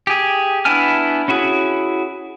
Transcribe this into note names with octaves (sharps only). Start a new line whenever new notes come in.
G4 G#4
B3 D4 E4 G#5 F6
C#4 E4 F#4 G#4